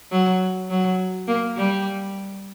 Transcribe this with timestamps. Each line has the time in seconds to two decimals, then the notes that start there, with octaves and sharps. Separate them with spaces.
0.11 F#3
0.70 F#3
1.28 A#3
1.56 G3